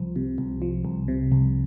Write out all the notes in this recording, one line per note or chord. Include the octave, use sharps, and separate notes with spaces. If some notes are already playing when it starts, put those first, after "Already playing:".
Already playing: C2 F3
C3
C2
F3
C2
C3
C2